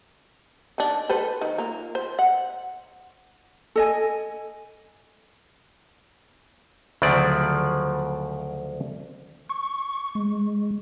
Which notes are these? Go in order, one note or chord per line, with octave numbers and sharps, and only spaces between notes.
D#3 D4
A4 B4 C5
D#3
A#3 F4
C5
F#5
A4 D#5 G#5
D2 C#3 F3 F#3 D5
C#6
G#3